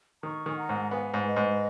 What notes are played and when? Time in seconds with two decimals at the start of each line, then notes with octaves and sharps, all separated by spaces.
0.23 D#3 A#5 C#6
0.46 D#3 G#5
0.57 F#5 A#5
0.69 G#2
0.91 B3 F5 G#5
1.14 G#2
1.25 B4 D#5
1.36 G#2